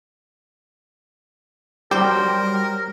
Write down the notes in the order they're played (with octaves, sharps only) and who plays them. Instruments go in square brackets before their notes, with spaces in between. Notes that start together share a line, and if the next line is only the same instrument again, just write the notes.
[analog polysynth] F#3 G3 [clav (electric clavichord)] G4 [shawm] A#4 [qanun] C5 G5